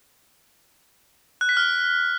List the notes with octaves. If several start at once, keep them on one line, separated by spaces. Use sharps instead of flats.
F#6
B6
F6